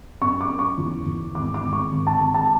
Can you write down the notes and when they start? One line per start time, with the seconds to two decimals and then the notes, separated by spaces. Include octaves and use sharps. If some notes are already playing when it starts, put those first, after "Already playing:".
0.22 F#2 C#6
0.41 D6
0.50 F#2
0.59 C#6
0.78 E2
1.06 E2
1.35 G#1 D6
1.54 D6
1.63 G#1
1.73 C#6
1.92 G#1
2.07 A5
2.20 G#1
2.34 A5